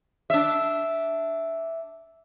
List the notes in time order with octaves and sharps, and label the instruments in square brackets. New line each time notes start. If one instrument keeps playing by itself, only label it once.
[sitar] D4 E5